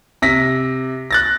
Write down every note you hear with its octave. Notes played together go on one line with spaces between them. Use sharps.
C3 A#6 B6
F#6 A6 A#6